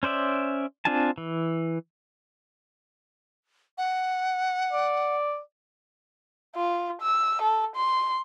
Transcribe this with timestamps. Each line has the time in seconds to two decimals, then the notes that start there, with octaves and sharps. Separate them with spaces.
0.03 C#4 C5 D5 E5
0.85 C4 D4 F4 G#5 A5
1.18 E3
3.78 F#5
4.73 D5
6.56 F4
7.02 E6
7.42 A4
7.76 C6